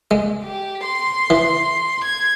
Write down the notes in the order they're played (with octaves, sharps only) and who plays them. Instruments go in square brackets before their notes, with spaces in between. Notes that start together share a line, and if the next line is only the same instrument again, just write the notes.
[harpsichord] G#3
[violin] G4
C6
[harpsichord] E3
[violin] G#6